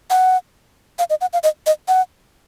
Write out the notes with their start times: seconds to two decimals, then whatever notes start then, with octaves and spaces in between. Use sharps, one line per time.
0.10 F#5
0.99 F5
1.10 D#5
1.21 F#5
1.33 F5
1.43 D#5
1.66 D#5
1.88 F#5